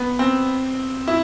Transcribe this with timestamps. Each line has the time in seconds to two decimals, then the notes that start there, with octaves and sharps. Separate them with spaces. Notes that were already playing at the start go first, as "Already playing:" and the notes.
Already playing: B3
0.19 C4
1.08 E4